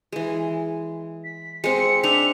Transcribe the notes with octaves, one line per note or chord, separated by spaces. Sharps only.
E3 G#3
B6
G#3 C4 C#7
D4 D#4 E5 F7